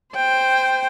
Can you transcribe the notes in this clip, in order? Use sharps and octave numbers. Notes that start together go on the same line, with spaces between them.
C5 G5